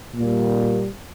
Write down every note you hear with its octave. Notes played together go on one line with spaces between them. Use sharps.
A#2 G3 A#3